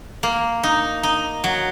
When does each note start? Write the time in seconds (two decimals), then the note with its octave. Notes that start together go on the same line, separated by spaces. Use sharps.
0.23 A#3
0.63 D#4
1.03 D#4
1.44 F#3